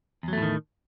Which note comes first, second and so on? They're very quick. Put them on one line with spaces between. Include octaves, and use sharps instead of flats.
E2 F#3 A3 A2 D#3